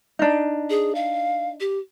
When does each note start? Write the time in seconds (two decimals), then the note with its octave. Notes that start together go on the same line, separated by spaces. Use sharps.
0.19 D4 D#4
0.70 G#4
0.95 F5
1.60 G4